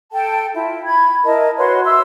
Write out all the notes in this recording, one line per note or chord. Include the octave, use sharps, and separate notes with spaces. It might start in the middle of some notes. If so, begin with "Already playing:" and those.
A4 G5 A5
E4 F4
B5 G#6
E4 A#4 D#5 A5
F#4 B4 C#5 C6
E5 C6 E6